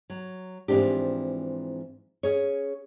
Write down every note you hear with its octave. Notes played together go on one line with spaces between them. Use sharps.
F#3
G#2 E3 F3 C4 D4 G4
C#4 G#4 C#5